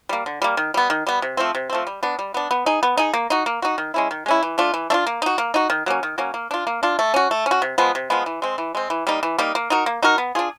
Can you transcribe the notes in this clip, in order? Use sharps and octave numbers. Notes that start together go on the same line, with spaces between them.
G3 A#3
D3
G3 A#3
D#3
G3 B3
D#3
G3 B3
C3
F3 A3 C4
C3
F3 A3 C4
G3
B3 D4
G3
B3 D4
B3
D#4 G#4
B3
D#4 G#4
A#3
D#4 F#4
A#3
D#4 F#4
D#3
G#3 C#4 E4
D#3
G#3 C#4 E4
E3
A3 D4 F4
E3
A3 D4 F4
A#3
D#4 F#4
A#3
D#4 F#4
D#3
F#3 A#3 C#4
D#3
F#3 A#3 C#4
A#3
D4 F4
A#3
D4 F4
A3
C#4 F#4
A3
C#4
F#4
C3
F3 G#3 B3
C3
F3 G#3 B3
E3
G#3 C4
E3
G#3 C4
E3
G3 A#3 D#4
E3
G3 A#3 D#4
A#3
D#4 F#4 A#4
A#3
D#4 F#4 A#4
B3
D4 F4 G#4